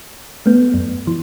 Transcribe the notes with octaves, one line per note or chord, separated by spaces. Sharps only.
A3 B3
F#2
E3